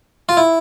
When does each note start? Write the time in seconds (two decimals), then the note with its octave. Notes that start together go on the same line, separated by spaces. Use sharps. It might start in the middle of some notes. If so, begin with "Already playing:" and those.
0.29 F4
0.37 E4